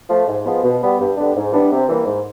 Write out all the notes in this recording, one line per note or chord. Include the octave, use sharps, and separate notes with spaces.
F3 A3
G#2
F3 G#3 B3
B2
G3 B3
G2
D3 G3 B3 D4
G#2
E3 G3 B3 D4
C3
E3 G3 A#3
G#2